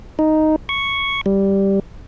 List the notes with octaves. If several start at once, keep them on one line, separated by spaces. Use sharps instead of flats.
D#4
C#6
G3